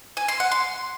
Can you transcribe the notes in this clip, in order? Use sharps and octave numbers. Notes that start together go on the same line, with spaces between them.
G#5
C6
F#5
C6